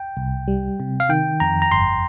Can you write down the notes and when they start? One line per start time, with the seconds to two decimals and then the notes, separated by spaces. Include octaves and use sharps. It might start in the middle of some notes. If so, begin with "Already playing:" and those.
Already playing: G5
0.17 C2
0.48 G3
0.80 C3
1.00 F5
1.09 D#3 G5
1.40 F2 A#5
1.62 A#5
1.72 G1 C6